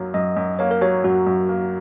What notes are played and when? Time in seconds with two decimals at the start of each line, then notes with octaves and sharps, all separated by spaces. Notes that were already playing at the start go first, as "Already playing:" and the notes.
Already playing: F#2 F#3 A#3
0.14 F#2 D#5
0.37 F#2
0.59 A#3 C#5
0.71 A#4
0.81 F#3 C#5
1.04 F#2 F#4
1.27 F#2
1.49 A#3